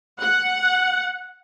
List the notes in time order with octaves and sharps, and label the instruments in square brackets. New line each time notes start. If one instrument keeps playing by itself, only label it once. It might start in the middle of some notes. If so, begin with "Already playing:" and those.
[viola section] F#5